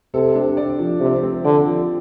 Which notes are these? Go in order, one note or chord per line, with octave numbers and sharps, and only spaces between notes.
C3 A4
D4
D5
F3
C3 G4
C4
D3 D5
F3